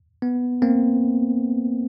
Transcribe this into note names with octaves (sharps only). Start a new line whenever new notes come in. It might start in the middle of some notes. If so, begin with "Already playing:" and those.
B3
A#3 C4